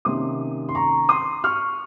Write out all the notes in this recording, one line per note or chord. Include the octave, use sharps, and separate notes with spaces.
C3 D#3 A#3 C#4 C6 D#6
C6
A#5 C#6
C6 D#6
C#6 F6